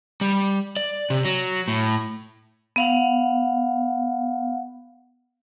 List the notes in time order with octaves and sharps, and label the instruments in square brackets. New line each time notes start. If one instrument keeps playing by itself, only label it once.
[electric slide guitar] G3
D5
C3
F#3
A2
[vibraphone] B3 F5 F#5